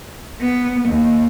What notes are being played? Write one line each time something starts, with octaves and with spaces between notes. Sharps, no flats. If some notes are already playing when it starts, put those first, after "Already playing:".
B3
D#2